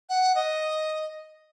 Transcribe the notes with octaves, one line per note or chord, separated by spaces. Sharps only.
F#5
D#5